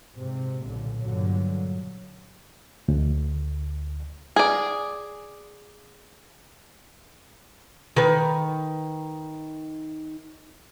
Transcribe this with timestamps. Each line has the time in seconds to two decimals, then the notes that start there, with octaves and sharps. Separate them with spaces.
0.14 G#2 C3
0.63 B1 A#2 D3
1.01 G2 A#2 D3 F#3
2.88 D2
4.36 G#4 D5
7.96 D#3 B4